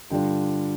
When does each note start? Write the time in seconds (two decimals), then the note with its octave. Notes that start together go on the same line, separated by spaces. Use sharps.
0.10 G2 D3 G3 D4 F4 G5